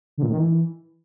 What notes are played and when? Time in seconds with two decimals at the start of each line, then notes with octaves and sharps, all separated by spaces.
0.18 D3
0.23 A#2
0.28 A2
0.33 D#3
0.38 E3